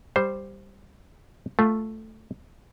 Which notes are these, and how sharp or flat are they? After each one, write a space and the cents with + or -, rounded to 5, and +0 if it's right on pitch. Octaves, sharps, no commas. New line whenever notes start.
G3 +0 C5 +0
A3 +0 F4 +0